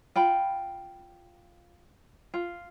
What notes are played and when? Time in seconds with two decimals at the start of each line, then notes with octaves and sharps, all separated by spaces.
0.16 F4 G5 B5
2.34 F4